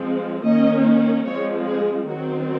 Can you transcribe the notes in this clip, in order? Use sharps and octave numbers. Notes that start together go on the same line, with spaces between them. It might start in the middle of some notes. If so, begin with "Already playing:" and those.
Already playing: F3 G#3 C4
D#3 A#3 C#4 D#5
F3 G#3 C4 C#5
G#4
D#3 F#3 C4 F#4